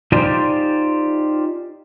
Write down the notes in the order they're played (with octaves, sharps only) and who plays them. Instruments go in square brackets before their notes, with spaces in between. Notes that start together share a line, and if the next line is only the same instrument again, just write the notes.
[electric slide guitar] D#4 F4 G4 C5 D5 G#5